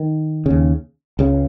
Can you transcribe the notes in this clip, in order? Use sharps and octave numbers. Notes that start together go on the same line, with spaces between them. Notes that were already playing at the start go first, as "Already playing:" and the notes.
Already playing: D#3
D#2 C#3
C#2 C#3